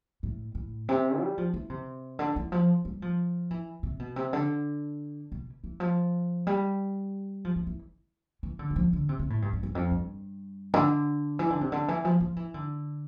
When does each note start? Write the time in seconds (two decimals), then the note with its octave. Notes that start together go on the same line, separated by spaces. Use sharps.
0.23 A2
0.55 A2
0.89 C3
1.20 G3
1.38 F3
1.54 E3
1.70 C3
2.19 D3
2.36 E3
2.52 F3
2.85 G3
3.02 F3
3.51 E3
3.83 C3
3.99 B2
4.16 C3
4.33 D3
5.32 B2
5.64 E3
5.80 F3
6.47 G3
7.45 F3
7.56 E3
7.67 E3
8.43 E3
8.59 D3
8.70 G3
8.76 F3
8.93 D3
9.09 C3
9.19 C3
9.30 A2
9.42 G2
9.53 G2
9.63 E2
9.75 F2
9.91 G2
10.74 D3
11.39 E3
11.50 D3
11.61 C3
11.72 D3
11.88 E3
12.05 F3
12.20 F3
12.36 E3
12.54 D3